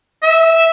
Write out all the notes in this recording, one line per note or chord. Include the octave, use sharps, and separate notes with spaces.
E5